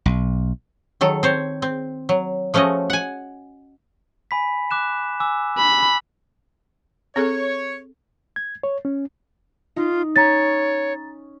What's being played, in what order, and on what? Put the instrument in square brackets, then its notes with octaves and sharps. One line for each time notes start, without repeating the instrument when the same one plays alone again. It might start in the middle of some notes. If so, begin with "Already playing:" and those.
[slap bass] B1
[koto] D#3 F#3 A4
C4 C5 C#5
C4
F#3
F3 A3 C#4 F#4 D#5
F#5 G#5
[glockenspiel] G#5 B5 B6
D6 F#6 E7
G#5 D6 E6
[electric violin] B5
[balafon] C4 G#4 A4 [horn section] C#5
[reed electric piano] G#6
C#5
C#4
[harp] D#4 [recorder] F4
[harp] C#4 [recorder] C#5 [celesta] A#5 A6